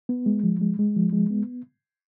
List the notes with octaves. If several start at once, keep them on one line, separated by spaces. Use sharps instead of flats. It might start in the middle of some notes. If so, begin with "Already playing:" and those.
B3
G#3
F3
G#3
G#3
F3
G#3
B3